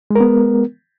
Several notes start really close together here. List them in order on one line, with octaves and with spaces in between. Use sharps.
G#3 A#4 B3